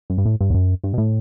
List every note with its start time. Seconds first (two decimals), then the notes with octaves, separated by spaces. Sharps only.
0.10 F#2
0.18 G2
0.26 A2
0.40 G2
0.50 E2
0.54 F#2
0.84 G2
0.93 B2
0.98 A2